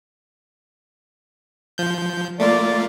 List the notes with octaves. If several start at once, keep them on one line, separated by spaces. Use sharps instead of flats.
F3 G6
A3 A#3 F4 D5